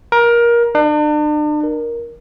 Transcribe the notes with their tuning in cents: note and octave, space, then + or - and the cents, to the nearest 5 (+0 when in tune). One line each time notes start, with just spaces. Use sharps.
A#4 +20
D4 +40
A#4 +10